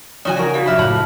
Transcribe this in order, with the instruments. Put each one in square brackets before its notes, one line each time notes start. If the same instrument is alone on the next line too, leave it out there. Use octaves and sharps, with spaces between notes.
[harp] C#3 F3 D#4 [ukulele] C#4 F#4 G#5 [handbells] D5 D#6
[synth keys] F#4 C#5 [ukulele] A#4
[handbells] F#4 G4 F5 [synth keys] B6
[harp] F#1 A#6 [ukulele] D4 E5 [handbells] B5 F6 F#6
[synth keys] A2 [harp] F5 [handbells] A5 F#6 [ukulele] B5